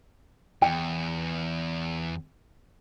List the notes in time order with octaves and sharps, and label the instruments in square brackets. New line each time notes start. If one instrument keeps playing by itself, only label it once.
[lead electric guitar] E2 [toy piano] G5